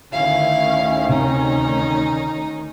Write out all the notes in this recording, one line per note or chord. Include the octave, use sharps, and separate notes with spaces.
D2 D#3 C#4 E4 F5
C3 D#4